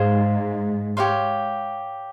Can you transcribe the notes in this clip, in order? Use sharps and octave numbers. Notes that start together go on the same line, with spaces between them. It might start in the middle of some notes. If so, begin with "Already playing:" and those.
Already playing: G#2 G#4 C5 F5
G4 C#5 F5 C6